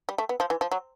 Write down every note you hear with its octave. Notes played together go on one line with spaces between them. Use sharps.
G3
A3
B3
F3
E3
F3
F#3